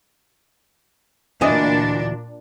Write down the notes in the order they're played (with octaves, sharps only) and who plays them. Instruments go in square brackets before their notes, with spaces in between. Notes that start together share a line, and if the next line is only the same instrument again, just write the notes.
[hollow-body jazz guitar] D2 E3 D#5 [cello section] A#2 D4